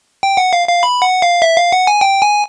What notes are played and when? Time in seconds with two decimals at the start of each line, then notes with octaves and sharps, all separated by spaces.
0.23 G5
0.37 F#5
0.53 F5
0.68 F5
0.83 B5
1.02 F#5
1.22 F5
1.42 E5
1.57 F5
1.72 F#5
1.87 G#5
2.01 G5
2.22 G#5